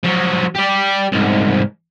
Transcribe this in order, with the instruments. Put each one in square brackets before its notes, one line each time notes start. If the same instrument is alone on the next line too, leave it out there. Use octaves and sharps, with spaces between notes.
[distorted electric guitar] F3 F#3
G4 D5
C2 G#2